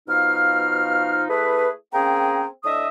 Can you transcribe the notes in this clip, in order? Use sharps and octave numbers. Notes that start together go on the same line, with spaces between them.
B2 F3 D#4 F5 F6
A3 E4 G#4 B4
A#3 C4 C#4 G#4 G5 A#5
A2 D4 D#5 E5 D#6